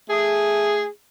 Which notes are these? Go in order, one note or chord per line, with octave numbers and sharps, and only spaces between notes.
A3 G#4